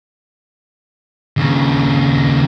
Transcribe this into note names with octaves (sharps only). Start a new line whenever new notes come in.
D#2 C#3